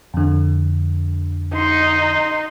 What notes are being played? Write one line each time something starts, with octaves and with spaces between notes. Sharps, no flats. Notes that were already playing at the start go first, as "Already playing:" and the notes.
F2 D3
D#4 C6